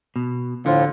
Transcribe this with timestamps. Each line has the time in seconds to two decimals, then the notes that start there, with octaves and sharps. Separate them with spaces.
0.16 B2
0.66 A2 D3 F3 F4